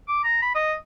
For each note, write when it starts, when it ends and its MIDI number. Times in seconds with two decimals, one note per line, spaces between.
0.08 0.18 86
0.24 0.41 82
0.42 0.50 83
0.55 0.73 75